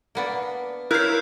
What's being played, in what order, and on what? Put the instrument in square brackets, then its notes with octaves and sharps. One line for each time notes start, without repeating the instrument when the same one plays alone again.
[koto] A#3 B3 D4
[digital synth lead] E4 [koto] F4 [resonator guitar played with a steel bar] A#4 C#5 [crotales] F#6 G6 C7